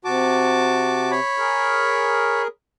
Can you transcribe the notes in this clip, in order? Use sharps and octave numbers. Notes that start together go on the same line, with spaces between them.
C3 F#4 A5 D6
C#5 B5
G#4 A#4